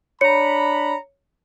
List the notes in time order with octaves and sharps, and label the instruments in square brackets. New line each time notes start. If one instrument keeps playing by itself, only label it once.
[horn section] D4 A#5 B5 [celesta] C#5 C#7